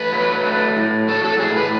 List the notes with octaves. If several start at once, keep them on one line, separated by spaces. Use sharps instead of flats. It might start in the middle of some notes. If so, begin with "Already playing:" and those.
Already playing: A3 B4
F#3
A3
A2
F#3 A4
A4
A2 G#4
B4